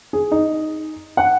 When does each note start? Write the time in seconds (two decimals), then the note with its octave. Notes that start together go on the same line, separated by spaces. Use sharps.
0.13 G#4
0.31 D#4
1.17 F#5